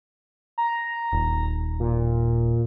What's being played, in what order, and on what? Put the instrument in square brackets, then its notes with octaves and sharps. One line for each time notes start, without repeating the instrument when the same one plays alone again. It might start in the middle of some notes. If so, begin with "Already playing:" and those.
[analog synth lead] A#5
[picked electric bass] D#1
[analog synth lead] A#2